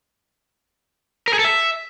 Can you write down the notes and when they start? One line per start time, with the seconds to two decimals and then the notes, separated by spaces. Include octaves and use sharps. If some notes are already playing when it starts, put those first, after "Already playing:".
1.28 A#4
1.33 G#4
1.39 A4
1.45 E5